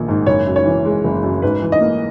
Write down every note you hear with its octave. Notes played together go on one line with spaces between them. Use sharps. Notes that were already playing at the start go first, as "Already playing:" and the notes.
Already playing: A#1 D#3 A#3
G#2
F#1 C#5
F#2
C#5
E3
G#3
F#1
F#2
G#2 B4
E3
D#5
A#3